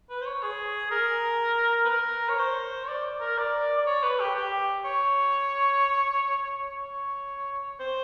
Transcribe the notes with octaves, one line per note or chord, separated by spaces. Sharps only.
B4
C5
C#5
G#4
A#4
B4
A#4
C#5
C5
C#5
D5
A#4
D5
D5
C#5
B4
G4
G4
C#5
C#5
C5